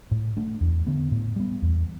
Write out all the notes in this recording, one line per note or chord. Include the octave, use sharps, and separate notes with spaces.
A2
A3 D4
E2
D3 B3
A2
G3 B3
E2